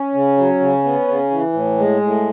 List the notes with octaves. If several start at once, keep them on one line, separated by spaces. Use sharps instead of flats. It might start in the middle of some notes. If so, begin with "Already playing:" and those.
Already playing: C#4
C#3
F#3
C#3
B3
C#3
E3
A2
G#3
A2